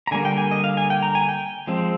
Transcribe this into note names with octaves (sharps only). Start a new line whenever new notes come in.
A#5
D3 G3 A#3 G#5
G5
G#5
D#5
F5
G#5
G5
A#5
G#5
G5
F3 G#3 C4